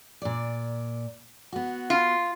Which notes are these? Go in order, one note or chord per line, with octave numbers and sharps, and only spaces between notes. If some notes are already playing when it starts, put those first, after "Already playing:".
A#2 D5
B3 F#4
F4